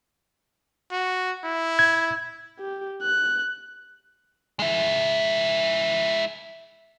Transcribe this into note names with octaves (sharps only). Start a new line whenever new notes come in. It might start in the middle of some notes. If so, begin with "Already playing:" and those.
F#4
E4
G#6
G4
F#6
G#3 E4